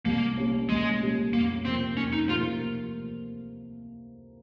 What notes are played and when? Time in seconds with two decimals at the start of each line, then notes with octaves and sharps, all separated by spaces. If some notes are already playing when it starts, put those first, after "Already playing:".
0.05 C2 A#3
0.37 A#2 G3 C#4
0.69 C2 G#3
1.01 A#2 G3 C#4
1.33 F2 A#3
1.65 C3 F3 A#3 C4
1.97 F2 C#4
2.13 D#4
2.29 C3 F3 A#3 F4